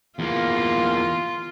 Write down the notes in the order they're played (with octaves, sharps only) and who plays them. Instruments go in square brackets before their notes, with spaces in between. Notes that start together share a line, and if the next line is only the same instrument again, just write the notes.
[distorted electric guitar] E2 A#3 [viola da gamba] F4